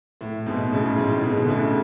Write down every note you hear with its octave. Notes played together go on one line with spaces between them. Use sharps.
A2
G#2 B2
A2 C#3
A2
G#2
A2
G#2 B2
D3
A2 C#3